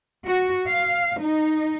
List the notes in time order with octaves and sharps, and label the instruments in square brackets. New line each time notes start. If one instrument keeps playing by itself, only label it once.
[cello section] F#4
F5
D#4